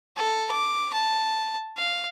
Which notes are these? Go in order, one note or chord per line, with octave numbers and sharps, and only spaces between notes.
A4
D6
A5
F5